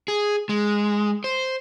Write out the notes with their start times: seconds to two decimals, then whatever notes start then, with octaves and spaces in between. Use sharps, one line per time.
0.08 G#4
0.49 G#3
1.24 C5